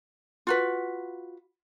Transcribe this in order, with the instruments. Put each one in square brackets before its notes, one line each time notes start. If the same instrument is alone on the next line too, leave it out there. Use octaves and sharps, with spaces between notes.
[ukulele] F4 F#4 B4